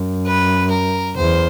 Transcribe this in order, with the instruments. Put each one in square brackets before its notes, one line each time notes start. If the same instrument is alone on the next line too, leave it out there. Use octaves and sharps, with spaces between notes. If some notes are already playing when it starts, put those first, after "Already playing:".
Already playing: [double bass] F#2
[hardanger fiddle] B4
A#4
[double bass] E2 [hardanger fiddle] C5